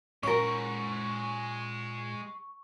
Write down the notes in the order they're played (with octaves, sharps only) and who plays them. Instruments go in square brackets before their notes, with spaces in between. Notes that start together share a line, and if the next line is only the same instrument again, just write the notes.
[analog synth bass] A#2 [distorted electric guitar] G#3 F#5 [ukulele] C#4 A#4 [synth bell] C#6